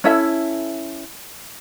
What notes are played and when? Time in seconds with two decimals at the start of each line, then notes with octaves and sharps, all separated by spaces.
0.04 C#4 E4 A4 E5